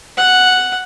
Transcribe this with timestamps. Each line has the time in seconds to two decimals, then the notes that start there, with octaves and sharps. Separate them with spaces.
0.17 F#5